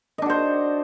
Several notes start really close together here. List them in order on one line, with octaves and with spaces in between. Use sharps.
D#5 D4 F#4 C5